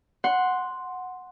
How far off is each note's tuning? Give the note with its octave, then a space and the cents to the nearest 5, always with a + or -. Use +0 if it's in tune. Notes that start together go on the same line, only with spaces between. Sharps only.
F#5 -5 C6 +0